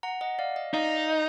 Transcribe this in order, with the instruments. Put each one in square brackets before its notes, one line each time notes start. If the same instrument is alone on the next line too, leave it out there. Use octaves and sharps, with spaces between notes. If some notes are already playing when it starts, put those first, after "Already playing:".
[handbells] F#5 A#5
D#5 F#5
D5 F5
D#5
[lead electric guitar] D#4 [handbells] D5 F5
[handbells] D#5